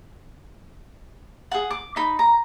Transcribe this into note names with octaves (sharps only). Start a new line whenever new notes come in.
G#4 F#5
D6
D#4 B5
A#5